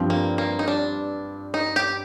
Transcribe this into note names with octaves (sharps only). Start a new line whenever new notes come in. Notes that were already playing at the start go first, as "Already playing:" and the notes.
Already playing: G2 F3 C4
A#3
A#3
D#4
D4
D#4
G4